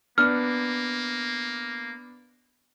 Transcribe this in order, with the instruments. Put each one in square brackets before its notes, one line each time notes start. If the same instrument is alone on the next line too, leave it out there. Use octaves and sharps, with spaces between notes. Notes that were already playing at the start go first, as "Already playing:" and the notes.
[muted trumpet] A#3 [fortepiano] B3 D4 [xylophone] F6